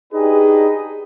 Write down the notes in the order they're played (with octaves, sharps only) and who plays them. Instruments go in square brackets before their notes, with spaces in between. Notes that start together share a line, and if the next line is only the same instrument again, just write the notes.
[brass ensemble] D4 D#4 G4 G#4 B4 D#5